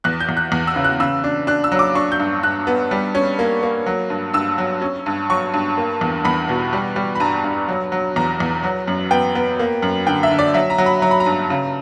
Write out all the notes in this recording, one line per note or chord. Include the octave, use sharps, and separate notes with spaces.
E2 F#6
G6
E2
F#6
E2
E6
C#3
F#6
C#3 E6
D4
D4 F#6
E6
F#3
D6
D4 C#6
G6
G2
G2 F#6
B3
G3
C#4
A#3
A#3
F#3
G2
G2 E6
F#3
C#4
G2
F#3 C#6
G2
A#3
E2
E2 B5
B2
G3
G3
B5
G2 A#5
G2
F#3
F#3
E2 A#5
E2
F#3
F#2
B3 G5
B3
A#3
F#2
D3 G5
E5
D3
D5
F#3 E5
A#5
F#3
B5
F#3 A#5
B5
A#5
G2
C#3